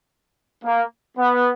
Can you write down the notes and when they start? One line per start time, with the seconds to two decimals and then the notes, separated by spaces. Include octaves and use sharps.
0.64 A#3
1.18 B3